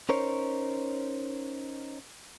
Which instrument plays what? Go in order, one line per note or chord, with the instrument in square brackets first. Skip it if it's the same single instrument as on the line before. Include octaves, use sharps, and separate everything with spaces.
[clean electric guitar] C#4 D#4 A#4 C5 C#5